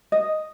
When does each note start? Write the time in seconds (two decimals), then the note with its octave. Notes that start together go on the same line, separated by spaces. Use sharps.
0.12 D#5